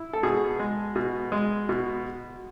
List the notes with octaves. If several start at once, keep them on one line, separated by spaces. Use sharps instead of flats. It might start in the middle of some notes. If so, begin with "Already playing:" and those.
Already playing: E4
A4
B2 G#4
G#3
B2
G#3
B2